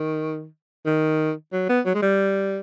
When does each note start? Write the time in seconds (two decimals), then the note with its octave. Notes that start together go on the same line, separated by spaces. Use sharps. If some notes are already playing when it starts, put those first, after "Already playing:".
Already playing: D#3
0.86 D#3
1.52 F#3
1.69 B3
1.86 F#3
1.94 G#3
2.02 G3